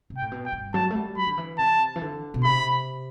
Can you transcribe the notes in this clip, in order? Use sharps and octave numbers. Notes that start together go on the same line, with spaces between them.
C3
G5
A2
B2
G5
G2
F#3 A5
A3
G3
F#3 B5
D3
E3
C3 A5
E3
D3
B2
C3 B5